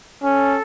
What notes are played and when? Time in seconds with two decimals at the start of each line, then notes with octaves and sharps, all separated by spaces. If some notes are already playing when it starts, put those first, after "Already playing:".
0.23 C#4 A4